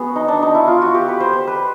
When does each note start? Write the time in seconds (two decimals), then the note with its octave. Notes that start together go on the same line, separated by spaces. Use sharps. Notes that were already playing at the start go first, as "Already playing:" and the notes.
Already playing: B3 F#4 G#4
0.16 D#4
0.28 D4
0.42 D#4
0.55 E4
0.68 F4
0.82 F#4
0.95 G4
1.08 B4
1.20 C5
1.33 C5
1.47 B4